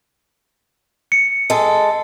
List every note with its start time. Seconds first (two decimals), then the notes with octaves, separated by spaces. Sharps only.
1.12 C#7
1.50 G#3 A4